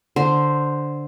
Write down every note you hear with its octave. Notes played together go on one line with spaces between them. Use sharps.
D3 C5